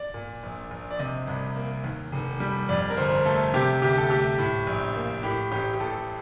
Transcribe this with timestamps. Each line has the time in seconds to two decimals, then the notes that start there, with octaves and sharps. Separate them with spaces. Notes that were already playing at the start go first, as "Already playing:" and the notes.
Already playing: D5
0.14 A#2
0.43 A#1
0.71 A#1
0.90 D5
0.99 C3 D#5
1.27 C2
1.56 A#3
1.84 D#2
2.12 F1
2.40 G3
2.69 F2 D5
2.90 A#4
2.97 G1 C5
3.25 A3 A4
3.54 C3 G4
3.82 D2 G4
3.98 A4
4.10 A3 G4
4.38 A2
4.67 A#1
4.95 A#3
5.23 A2 G4
5.52 A1 G4
5.74 G4
5.80 A1 A4